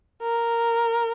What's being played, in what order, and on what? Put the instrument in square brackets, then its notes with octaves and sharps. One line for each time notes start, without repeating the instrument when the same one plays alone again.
[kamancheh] A#4